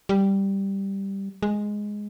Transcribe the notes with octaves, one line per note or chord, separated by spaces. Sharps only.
G3
G#3